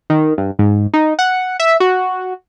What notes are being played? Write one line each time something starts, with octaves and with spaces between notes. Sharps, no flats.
D#3
G2
G#2
D#4
F#5
E5
F#4